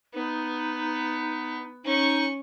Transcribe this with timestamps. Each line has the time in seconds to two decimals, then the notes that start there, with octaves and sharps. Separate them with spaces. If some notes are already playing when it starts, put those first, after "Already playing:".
0.14 B3 D#4
1.84 C#4 D#4 C#6